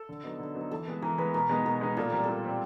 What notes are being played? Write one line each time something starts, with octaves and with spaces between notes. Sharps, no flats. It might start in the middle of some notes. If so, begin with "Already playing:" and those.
Already playing: A4
D3
F#3 B3 D#4
D3
F#3 B3 D#4
E3 A4
G#3 B3
E3 A#4
G#3 B3 B4
B2 A#4
G#3 B3 D#4
B2 A#4
G#3 B3 D#4
A#2 A4
G3 C4 A#4
A#2 A4
G3 C4